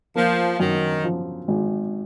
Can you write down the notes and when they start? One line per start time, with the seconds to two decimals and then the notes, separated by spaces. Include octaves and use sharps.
0.15 F3 A#3
0.60 F#2 D#3
1.04 F3
1.48 G#1